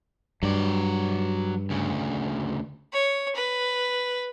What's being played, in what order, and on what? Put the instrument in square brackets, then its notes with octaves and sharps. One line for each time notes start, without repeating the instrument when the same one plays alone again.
[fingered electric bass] G2 [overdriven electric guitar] F#3 D5
[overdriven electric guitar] D2 C#3
[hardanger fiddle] C#5
B4